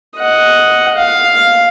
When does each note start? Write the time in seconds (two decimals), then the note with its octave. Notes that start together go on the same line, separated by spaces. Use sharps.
0.17 D#5 F#5
0.96 F5